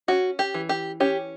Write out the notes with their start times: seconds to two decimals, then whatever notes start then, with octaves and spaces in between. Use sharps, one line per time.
0.08 C#4 F#4
0.39 G4
0.54 E3
0.69 G4
1.00 C#4 G4